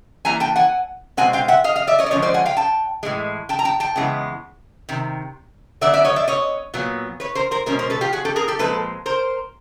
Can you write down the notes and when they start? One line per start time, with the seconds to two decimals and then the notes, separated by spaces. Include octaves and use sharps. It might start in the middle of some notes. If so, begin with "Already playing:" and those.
0.25 E3 G3 A#3 G#5 A#5
0.40 G5 A5
0.56 F#5 G#5
1.17 B2 G#3 C4 F#5 G#5
1.33 F5 G5
1.48 E5 F#5
1.64 D#5 F5
1.76 D#5 F5
1.87 D5 E5
1.98 C#5 D#5
2.06 D5
2.10 D3 F3 G#3 C#4 C#5 D#5
2.22 C5 D5
2.34 F#5 G#5
2.45 F5 G5
2.57 G5 A5
3.03 A2 E3 G#3
3.49 G5 A5
3.59 A#5
3.65 G5 A5
3.80 G5 A5
3.96 C#3 E3 G#3 B3
4.89 C3 D#3
5.81 D3 F#3 B3 D5 E5
5.93 D5 E5
6.04 C#5 D#5
6.16 D5 E5
6.28 C#5 D#5
6.74 A#2 F#3 B3
7.20 B4 C#5
7.35 A#4 C5
7.51 A#4 C5
7.66 B2 G#3 C#4 A#4 C5
7.79 A#4 C5
7.90 A4 B4
8.01 F4 G4
8.13 F#4 G#4
8.25 G4 A4
8.36 G#4 A#4
8.48 G4 A4
8.59 A#2 F3 G#3 C4 A4 B4
9.06 A#4 C5